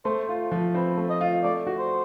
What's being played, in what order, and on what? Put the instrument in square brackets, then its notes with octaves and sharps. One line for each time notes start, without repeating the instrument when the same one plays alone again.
[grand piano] A3 [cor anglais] C5
[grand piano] F4
F3
[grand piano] C4 [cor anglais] B4
[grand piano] A3
[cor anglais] D#5
[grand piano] F4
[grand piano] A3 [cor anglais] D5
[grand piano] F#4
[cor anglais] C5